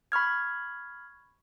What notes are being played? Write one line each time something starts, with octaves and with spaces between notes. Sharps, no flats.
B5 C#6 F6 G#6